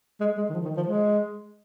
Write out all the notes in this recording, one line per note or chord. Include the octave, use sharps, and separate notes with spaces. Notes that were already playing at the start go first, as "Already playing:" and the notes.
G#3
G#3
D#3
F3
D#3
F3
G#3